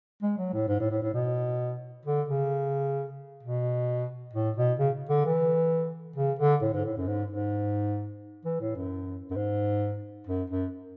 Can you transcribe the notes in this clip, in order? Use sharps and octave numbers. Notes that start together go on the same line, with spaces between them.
G#3
F#3
A2
G#2
A2
A2
A2
B2
D3
C#3
B2
A2
B2
C#3
D3
E3
C#3
D3
A2
G#2
A2
F#2
G#2
G#2
E3
A2
F#2
F#2
G#2
F#2
F#2